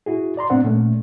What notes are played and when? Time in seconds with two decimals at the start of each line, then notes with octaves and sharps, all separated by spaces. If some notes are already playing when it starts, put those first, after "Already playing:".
0.06 E4 F#4 G#4
0.37 D5 A#5 C6
0.50 A2 B3 C4 D4 C5 F#5
0.64 A#2 A3 C#4